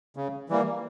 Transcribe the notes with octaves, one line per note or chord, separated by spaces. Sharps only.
C#3
E3 G3 A#3